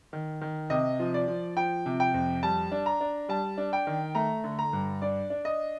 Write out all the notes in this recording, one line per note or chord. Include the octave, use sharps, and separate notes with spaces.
D#3
D#3
C3 D#5
F3
D5
F3
F3 G5
C3
G5
F2
G3 A5
D4
A#5
D4
G3 A5
D4
G5
D#3
A3 A#5
D3
A#5
G2
D4 D5
D4
D#5